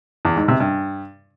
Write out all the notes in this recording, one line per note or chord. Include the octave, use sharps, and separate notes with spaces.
E2
G#2
C3
G2